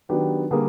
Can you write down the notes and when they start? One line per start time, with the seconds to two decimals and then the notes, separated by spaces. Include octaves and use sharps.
0.09 D#3 F#3 B3 D4 G4
0.51 D3 G3 A#3 G#4